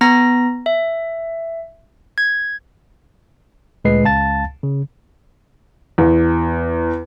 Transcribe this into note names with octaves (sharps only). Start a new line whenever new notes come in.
B3 A#5 A#6
E5
G#6
D2 A#2 G#3 B4 D#5 C7
C#2 F5 A5 A6
C#3
E2